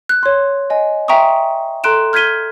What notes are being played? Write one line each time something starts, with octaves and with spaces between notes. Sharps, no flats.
F#6
C#5 C6
D#5 G#5
E5 G5 A#5 C6 C#6 D#6
A4 A#5 C6 F#6 D7 E7
F6 G6 G#6 B6 D#7 G7